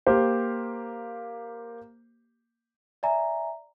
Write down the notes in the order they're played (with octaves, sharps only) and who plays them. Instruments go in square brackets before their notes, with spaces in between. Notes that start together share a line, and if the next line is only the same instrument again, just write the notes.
[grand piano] A#3 G4 C5
[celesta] D5 E5 G#5 A#5